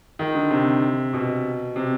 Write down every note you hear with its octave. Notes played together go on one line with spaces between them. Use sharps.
D#3
D3
C3
B2
C3